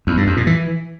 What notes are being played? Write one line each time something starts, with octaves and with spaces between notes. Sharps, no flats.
E2
G2
F2
A#2
E3